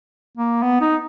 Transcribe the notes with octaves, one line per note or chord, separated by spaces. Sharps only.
A#3
B3
D#4